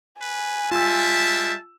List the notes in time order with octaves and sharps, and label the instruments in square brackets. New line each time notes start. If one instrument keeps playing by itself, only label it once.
[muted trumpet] B4 [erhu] G#5
[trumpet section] G3 G#3 E5 [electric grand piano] F4 E6 [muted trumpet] A5